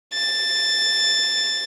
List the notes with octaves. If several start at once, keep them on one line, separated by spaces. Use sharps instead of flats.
A6